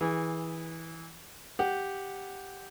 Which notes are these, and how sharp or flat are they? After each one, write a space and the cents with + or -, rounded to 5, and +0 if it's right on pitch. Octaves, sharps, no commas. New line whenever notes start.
E3 -15 G#4 -10
G4 +0 F#5 +0